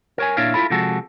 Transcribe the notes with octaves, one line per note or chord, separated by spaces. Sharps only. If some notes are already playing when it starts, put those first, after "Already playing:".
A#4 C#5 G#5
A#2 D4 E4 C#5 F5
E4 F4 A4 B5
C3 F3 G#3 F#4 A4